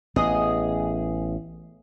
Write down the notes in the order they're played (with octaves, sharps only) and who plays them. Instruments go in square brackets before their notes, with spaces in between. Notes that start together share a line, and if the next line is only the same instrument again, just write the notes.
[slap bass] A1 B3 [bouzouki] G#4 D#5